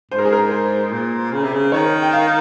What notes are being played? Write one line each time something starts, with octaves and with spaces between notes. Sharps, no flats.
G#2 C5
A#4
G#4
A#4
C5
A#2
C#3
C3
C#3
D#3 C#5
G5
F5